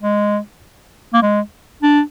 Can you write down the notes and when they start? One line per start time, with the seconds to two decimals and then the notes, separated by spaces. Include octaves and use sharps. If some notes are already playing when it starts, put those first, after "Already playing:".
0.03 G#3
1.13 A#3
1.22 G#3
1.82 D4